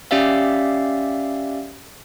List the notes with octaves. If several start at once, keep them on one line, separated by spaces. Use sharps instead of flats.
C#4 G4 D5 E5 F5